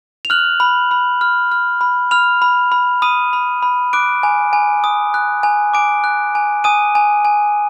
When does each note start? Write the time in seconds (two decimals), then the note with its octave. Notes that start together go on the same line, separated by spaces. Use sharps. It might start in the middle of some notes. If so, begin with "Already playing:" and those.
0.25 F7
0.30 F6 F#6 F#7
0.60 B5
0.91 B5
1.21 F6
1.51 F6
1.81 B5
2.11 B5 F6 F7
2.42 B5
2.72 B5
3.02 B5 D#6 D#7
3.33 B5
3.62 B5
3.93 D6 F#6 D7
4.23 G#5
4.53 G#5
4.84 D#6
5.14 F#6
5.43 G#5
5.74 G#5 D6 D7
6.04 F#6
6.35 G#5
6.64 G#5 D#6 D#7
6.95 G#5
7.25 G#5